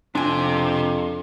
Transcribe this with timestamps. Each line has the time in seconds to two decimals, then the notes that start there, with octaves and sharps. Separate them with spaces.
0.15 F2 C3 D4 G#5